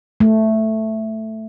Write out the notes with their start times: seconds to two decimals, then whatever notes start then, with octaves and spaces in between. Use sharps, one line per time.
0.20 A3